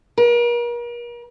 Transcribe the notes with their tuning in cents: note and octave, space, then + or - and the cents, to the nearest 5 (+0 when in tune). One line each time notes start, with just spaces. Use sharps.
A#4 +40